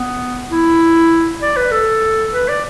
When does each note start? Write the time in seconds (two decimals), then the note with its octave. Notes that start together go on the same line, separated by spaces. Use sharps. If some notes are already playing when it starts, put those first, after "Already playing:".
Already playing: B3
0.51 E4
1.42 D5
1.57 B4
1.72 A4
2.32 B4
2.48 D5